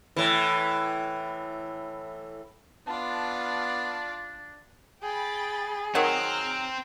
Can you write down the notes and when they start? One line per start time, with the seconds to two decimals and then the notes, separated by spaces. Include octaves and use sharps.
0.17 A2 E3
2.87 B3 D4 F4 D5 A5
5.02 G#4 G5 B5 A6
5.95 D#3 F#3 C4 A#5 F6 F#6